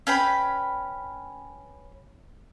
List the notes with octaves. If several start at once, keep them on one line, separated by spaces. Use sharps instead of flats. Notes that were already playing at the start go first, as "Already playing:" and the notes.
C#4 B4 G5 B5